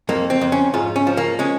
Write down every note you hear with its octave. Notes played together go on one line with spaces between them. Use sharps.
F2 A#3
C4
F2
C#4
G#2 F4
C#4
F3
A#3
G#3 C#4